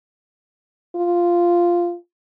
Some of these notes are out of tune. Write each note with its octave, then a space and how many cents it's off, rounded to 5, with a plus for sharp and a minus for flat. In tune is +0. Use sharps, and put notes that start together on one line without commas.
F4 -5